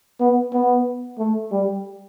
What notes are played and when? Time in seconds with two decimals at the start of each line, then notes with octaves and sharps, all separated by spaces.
0.20 B3
0.53 B3
1.19 A3
1.52 G3